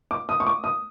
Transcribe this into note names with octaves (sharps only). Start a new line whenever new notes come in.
D6
D#6
C#6
D6
D#6